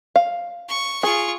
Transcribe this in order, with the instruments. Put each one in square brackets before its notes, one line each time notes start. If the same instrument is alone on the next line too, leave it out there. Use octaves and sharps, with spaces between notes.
[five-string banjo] F5
[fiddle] C#6
[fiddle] F4 C#6 [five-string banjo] G#4